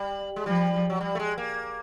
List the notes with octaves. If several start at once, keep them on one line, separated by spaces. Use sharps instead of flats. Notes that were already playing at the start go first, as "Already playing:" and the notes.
Already playing: G3
G#3
F3 G3
F#3
G3
A3
G#3
A#3